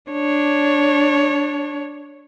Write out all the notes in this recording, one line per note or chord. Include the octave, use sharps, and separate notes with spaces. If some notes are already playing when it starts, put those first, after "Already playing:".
D4 C#5